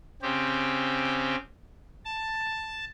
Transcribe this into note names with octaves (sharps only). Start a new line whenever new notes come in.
C#3 C4 G4
A5